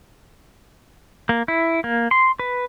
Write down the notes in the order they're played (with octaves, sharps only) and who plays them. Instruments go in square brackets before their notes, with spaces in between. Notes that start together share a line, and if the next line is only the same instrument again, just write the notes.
[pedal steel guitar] A#3
E4
A#3
C6
B4